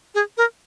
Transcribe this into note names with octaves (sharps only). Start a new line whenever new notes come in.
G#4
A#4